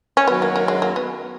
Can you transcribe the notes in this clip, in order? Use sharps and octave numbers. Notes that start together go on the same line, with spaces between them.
C#4
F#2 D#3 F#3 B3 C#4
A#3
A#3
G#3
A#3
B3